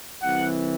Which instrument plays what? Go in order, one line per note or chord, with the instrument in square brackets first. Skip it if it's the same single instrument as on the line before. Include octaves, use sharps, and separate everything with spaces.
[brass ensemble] C2 C3 E3 F#5